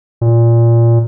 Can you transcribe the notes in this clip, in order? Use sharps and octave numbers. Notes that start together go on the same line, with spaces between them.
A#2